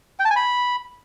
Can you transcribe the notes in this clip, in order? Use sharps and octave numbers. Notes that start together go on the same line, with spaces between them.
G5
A5
G#5
B5